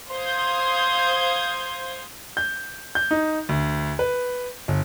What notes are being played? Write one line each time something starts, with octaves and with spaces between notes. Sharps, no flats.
C5 F5 C6 D#6 G6 G#6
G6
G6
D#4
D2
B4
G1